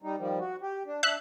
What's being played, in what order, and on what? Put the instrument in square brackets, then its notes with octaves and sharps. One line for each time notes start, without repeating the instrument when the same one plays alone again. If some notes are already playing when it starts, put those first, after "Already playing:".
[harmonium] G3 D#4
D#3 F3 G3
F#4
G4
D4
[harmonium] D4 [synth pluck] E5 F#6